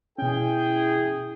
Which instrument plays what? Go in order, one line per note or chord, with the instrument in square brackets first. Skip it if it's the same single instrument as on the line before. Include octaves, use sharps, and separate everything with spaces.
[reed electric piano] B2 C#4 [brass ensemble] E4 G#4 [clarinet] G5